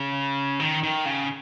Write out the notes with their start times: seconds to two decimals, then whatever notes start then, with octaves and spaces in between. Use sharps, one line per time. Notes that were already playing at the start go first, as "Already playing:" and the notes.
Already playing: C#3
0.59 D#3
0.83 D#3
1.05 C#3